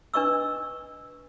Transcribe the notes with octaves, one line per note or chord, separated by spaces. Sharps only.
D4 B4 D#5 C#6 E6